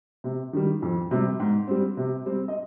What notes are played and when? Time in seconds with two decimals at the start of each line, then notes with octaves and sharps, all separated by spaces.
0.24 C3
0.53 D#3 G3
0.82 F2
1.11 C3 G3
1.40 G#2
1.68 G3 C4
1.97 C3
2.26 G3 C4
2.48 D#5